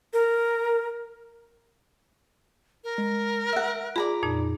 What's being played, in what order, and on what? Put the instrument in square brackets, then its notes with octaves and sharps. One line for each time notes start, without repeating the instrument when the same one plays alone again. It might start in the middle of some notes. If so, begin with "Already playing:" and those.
[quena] A#4
[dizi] A#4
[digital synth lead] G#3
[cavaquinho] E5 F#5 [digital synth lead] D7
[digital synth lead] F4 [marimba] G#4 [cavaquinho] D5 A#5 B5
[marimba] F2 A#2 D#4